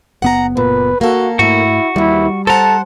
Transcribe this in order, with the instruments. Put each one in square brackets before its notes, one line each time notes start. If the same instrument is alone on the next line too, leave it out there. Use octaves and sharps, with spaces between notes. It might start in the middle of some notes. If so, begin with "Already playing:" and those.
[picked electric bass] F#1 B3 [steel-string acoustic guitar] F#5 A#5
[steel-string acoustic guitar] A#2 [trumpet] B4
[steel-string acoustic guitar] A#3 A4 [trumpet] F#4
[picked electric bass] G#2 A3 [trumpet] E4 [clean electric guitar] F#4
[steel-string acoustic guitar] D#2 E3 [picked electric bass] G3 [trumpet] E4
[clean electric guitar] A4 A#5 [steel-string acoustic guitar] C5 F#5 [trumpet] A5